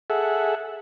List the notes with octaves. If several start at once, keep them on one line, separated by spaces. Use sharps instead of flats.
G#4 A4 E5 F#5